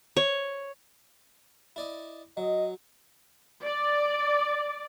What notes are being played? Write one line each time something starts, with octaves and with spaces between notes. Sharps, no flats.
C#5
E4 D5 D#5
F#3 D#5
D5